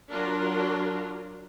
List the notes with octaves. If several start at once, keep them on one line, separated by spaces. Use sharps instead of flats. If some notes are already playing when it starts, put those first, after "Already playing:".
F#3 D4 F4 A#4